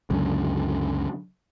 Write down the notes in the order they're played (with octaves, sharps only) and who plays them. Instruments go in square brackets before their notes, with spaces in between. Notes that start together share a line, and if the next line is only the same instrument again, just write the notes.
[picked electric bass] C#2 F#2 D3